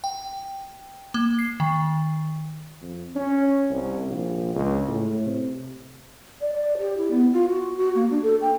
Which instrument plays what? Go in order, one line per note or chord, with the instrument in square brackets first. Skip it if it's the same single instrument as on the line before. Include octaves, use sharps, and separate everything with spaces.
[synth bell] G5
A#3
C7
D#3
[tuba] F2
C#4
C2
A#1
C#2
A2
C3
[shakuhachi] D5
D5
G4
E4
B3
F4
F#4
F#4
A#3
D4
A4
G5